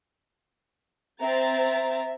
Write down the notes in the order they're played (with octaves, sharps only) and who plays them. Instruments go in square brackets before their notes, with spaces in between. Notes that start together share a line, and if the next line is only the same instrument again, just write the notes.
[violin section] C4 A#5 A6 [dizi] E5